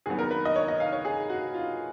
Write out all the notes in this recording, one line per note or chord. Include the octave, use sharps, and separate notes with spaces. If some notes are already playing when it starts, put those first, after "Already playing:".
D#2 D#3 F#3 B3 G#4
A#4
B4
D#5
C#5
D#5
F5
C#5
G#4
F#4
F4